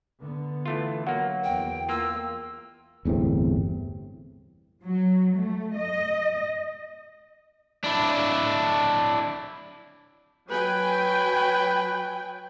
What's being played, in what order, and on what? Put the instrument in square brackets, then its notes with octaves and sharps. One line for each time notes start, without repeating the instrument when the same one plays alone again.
[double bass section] D3 B3
[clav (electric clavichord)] E3 A3 F4
[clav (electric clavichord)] F#3 A#3 [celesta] F#5
[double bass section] E2 [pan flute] G5
[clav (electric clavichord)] A#3 F4 [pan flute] E6
[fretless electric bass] G1 E2 A2 C3
[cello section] F#3
A3
D#5
[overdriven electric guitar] D4 E4
[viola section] F#3 G5 G#5 [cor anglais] B4